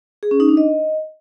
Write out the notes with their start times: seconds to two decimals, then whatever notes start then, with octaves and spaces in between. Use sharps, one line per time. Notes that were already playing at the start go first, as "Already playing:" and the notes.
0.23 G#4
0.31 C#4
0.40 D#4
0.49 D4
0.57 D#5